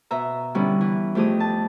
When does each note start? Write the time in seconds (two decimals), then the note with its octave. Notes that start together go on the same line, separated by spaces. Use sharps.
0.11 B2 E5 A#5
0.55 D3 G3 B3 C#4 E4
0.81 E3
1.15 F2 A3 G4 G#4 D#6
1.40 A5